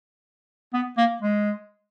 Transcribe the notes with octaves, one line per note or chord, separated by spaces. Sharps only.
B3
A#3
G#3